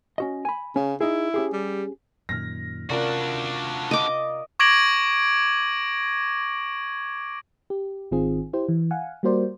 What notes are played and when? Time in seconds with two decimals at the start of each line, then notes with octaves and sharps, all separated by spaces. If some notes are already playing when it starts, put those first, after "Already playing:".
0.18 C#4 F#4 D#5
0.45 G#5 B5
0.76 C#3 C#4
1.00 D#4 E4 G#4
1.34 C#4 G4 G#4
1.53 G3
2.29 F#2 A#2 D#3 F6 A#6
2.90 C3 C#4 D4 F4 F#4 A#4 D5
3.91 D#5 D6
4.59 C#6 D6 G#6 A#6 D7 F#7
7.70 G4
8.11 G#1 D#3 C4 F4 G#4
8.53 E4 G4 C5
8.69 E3
8.91 F5 F#5 G#5
9.23 G3 A#3 F#4 A#4 C5 D5